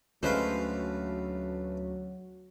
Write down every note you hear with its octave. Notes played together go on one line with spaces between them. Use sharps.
D2 F#3 G#3 A3 C#4 B4 C5 F5